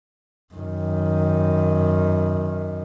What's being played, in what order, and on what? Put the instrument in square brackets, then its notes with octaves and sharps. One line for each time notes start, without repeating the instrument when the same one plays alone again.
[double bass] F#2 D#3